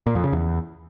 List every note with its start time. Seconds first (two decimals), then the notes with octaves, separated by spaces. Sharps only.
0.07 A#2
0.15 F2
0.24 C#3
0.32 E2